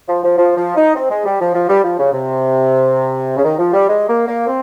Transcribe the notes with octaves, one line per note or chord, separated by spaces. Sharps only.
F3
F3
F3
F3
D#4
C4
G#3
G3
F3
F3
G3
F3
C#3
C3
C#3
D#3
F3
G3
G#3
A#3
A#3
C4